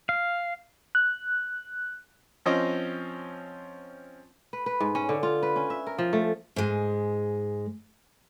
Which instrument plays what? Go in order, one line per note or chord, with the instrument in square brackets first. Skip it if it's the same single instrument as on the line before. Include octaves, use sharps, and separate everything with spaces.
[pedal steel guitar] F5
[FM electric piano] F#6
[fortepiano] F3 C4 C#4 D#5
[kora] B4
B4
G#2
C#4
D3
F4
B4
C#4
E5
A#4
F3
A3
[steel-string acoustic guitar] G#2 G#3